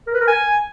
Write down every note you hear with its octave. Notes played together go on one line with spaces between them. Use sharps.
A#4
B4
A#4
G#5